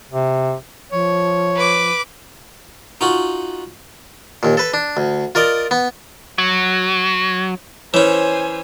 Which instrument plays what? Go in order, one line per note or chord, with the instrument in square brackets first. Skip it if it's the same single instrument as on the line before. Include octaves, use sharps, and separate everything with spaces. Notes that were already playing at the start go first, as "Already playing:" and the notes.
[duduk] C3
[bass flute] F3 [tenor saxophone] C#5
[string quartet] B4 D6
[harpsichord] D#4 F4 F#4
D#2 A#2
A4 B4
D4
D2
F4 A#4 D5 D#5
B3
[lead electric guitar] F#3
[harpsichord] E3 C#4 [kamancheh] C5 G#5 [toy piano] C#5